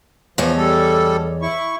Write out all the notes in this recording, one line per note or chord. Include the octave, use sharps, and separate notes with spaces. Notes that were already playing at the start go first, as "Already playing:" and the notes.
E2 F3 C#5 D#5
G3 A4
E4 C#6